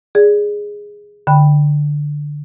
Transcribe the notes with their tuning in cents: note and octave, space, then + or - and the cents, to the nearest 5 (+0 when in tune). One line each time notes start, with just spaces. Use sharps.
G#4 -5 D5 -15
D3 +5 G5 +0 B5 +0